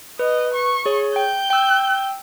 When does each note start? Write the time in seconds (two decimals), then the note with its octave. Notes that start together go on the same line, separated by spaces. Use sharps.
0.19 B4 D#5
0.54 C#6
0.86 G#4 C#5
1.16 G5 G6
1.50 G5 E6